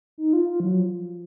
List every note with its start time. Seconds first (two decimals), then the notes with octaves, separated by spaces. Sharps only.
0.18 D#4
0.33 F4
0.49 F4
0.60 F3
0.64 F#3
0.80 F3